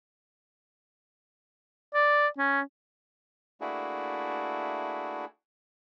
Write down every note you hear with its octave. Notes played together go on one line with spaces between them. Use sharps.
D5
C#4
A3 A#3 D4 E4 F#4 G#4